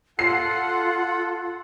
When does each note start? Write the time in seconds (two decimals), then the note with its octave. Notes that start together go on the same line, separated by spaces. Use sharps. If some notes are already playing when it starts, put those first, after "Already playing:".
0.19 F4 A4 F#5 C7